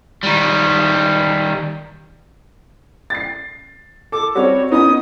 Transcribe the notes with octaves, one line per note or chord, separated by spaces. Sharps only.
D#3 G3
A6 C7
A4 D6
G3 C4 F#4 C#5
B3 C#4 D#4 D#6